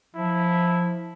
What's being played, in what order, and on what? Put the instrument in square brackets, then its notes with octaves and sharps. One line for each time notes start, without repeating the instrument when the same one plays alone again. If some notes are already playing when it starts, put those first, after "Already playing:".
[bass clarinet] F3 [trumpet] E4